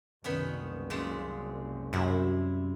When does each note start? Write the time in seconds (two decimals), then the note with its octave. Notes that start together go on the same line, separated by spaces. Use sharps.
0.24 F#1 C2 D#3 B3 C#4
0.90 A#2 C#3 G#3
1.93 F#2 C3 E4